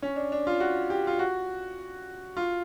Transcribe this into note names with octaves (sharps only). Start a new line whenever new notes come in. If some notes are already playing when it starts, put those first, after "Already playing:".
C#4
D4
D4
F4
F#4
G4
F4
F#4
F4